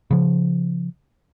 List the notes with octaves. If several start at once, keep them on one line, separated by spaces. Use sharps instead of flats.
C#3 F3